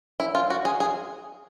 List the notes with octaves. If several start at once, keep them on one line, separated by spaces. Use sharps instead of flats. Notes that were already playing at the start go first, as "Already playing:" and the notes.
E4
F4
F#4
G#4
G#4